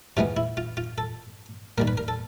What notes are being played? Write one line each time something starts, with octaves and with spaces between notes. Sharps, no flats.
C3 E3 G#3 B3 F4
E4
F4
F4
A4
D#3 G3 A#3 A#4
B4
A#4
A4